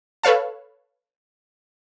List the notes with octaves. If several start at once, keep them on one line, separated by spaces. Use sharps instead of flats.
A4 B4 C#5 F5 A5